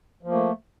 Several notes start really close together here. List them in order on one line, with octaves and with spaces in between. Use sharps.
F3 A#3 A3